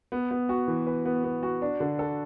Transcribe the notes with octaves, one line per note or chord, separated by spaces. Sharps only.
B3
B3
F#4
E3
B4
B3
B3
F#4
D4
D3
A4